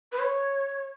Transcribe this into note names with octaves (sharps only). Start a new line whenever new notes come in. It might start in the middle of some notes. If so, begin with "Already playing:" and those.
B4
C#5